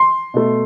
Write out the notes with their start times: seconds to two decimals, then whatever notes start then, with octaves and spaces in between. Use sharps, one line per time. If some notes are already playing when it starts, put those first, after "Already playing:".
Already playing: C6
0.34 B2 A3